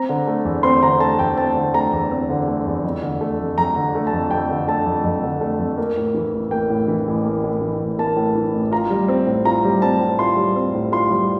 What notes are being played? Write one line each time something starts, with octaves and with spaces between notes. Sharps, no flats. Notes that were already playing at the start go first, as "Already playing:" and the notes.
Already playing: C4 A#5
D3
A3
E2
C4 C6
D3 A#5
A3 A5
E2 G5
C4 A5
D3
A3 A#5
E2
C4
D3
A3
E2
F2
D3
A3
F2
F2 A#5
D3
A3
A5
F2
F2 G5
D3
A3 A5
F2
F2
D3
A3
F2
A#3
A2
E3
A1
A#3 G5
A2
E3
A1
A#3
A2
E3
A1
A#3 A5
A2
E3
A1
F4 A#5
G3
C4
A2
F4 A#5
G3
C4 A5
A2
F4 C6
G3
C4
A2
F4 C6
G3